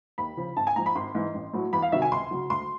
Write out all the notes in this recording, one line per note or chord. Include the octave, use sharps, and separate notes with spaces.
D#2 B5
C#3 F3
G#1 A5
G#5
G#2 F3 A#5
B5
G#1 C6
G#2 E3
A1
A2 F#3
E2 B5
F5
C3 D#3 F#3 E5
G#5
C#2 C6
C#3 F#3
D2 C6